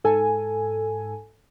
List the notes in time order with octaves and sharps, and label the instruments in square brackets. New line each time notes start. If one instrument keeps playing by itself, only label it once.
[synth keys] G#2 A4 G#5